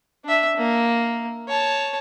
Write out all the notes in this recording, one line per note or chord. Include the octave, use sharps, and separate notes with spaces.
D4 E5
A#3
C#5 A5